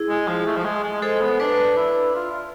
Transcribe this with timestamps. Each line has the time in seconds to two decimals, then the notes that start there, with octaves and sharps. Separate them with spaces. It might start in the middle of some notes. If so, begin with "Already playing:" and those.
Already playing: E4 G#4
0.09 G#3
0.27 F3
0.46 A3
0.56 F3
0.65 G#3
0.83 G#3
1.02 G#3 A4 C5
1.21 B3
1.40 D4 B4 D5
1.77 E4
2.15 F4
2.31 F4